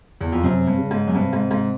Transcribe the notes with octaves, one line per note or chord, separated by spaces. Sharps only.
E2
F2
F#2 C3
G2
C#3
G#2
F#2
G2 C3
G#2
G#2